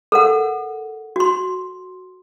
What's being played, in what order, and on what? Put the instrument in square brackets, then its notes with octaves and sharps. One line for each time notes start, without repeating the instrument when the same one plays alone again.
[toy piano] A4 A#4 F#5
F#4 C6